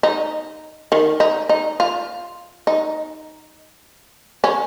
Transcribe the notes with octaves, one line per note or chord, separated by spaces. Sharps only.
D#4
D#3
D#4
D#4
F4
D#4
C#4